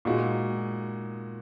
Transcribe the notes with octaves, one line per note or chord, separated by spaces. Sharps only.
A#2 G#3 D#4 F#4